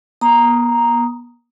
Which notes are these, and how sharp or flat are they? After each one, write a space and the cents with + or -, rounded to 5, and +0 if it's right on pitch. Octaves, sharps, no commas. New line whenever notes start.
B3 -40 A#5 +0 D#6 +5